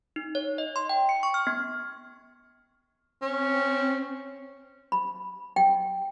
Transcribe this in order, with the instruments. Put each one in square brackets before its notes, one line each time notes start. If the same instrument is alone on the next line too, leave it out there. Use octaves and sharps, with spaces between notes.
[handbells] D#4
C#5
D#5
C6
G5
C#7
C#6
F6
B3
[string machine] C4 [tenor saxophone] C#4
[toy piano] B5
G5